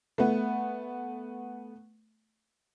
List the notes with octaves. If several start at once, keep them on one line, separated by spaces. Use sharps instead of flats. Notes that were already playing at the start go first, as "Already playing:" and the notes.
A3 B3